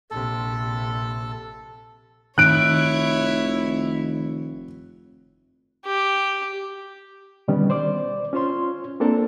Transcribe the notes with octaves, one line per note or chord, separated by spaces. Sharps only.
A#1 C3 A4
F1 D#3 E4 C#5 F#6 D7
G4
B2 D3 D#3 G3 B3 C#4
C5 D5 D6
C#4 F4 C5 C#5 C6
A#3 C4 D4 A4 A#4 A5